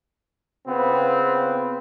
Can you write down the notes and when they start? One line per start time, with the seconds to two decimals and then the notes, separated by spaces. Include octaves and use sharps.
0.67 C#3 B3 C4 F4 B4